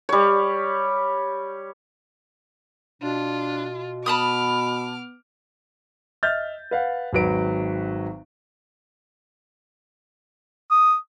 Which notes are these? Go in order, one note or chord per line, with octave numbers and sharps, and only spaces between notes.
G3 C#5
B2 D4 F4
B3 A5 B5 D6 D#6 F6
D#5 E5 F6 G6 A6
B4 F5 F#5
G#1 D#3 F#3 B4 D7
D#6